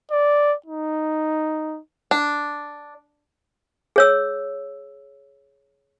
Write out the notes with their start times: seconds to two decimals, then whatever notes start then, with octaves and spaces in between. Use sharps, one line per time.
0.11 D5
0.66 D#4
2.11 D4
3.96 G#4 C#5 E6